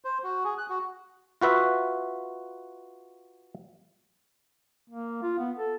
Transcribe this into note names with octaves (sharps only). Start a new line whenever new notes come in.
C5
F#4
G#4
F#6
F#4
F4 F#4 B4 E5
A#3
F4
B3
A4